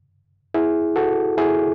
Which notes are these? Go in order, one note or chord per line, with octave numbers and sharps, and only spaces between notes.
E4 G#4
F#4 A4
E4 G#4